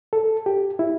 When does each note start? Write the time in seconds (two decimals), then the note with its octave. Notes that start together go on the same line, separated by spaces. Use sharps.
0.13 A4
0.46 G4
0.79 E4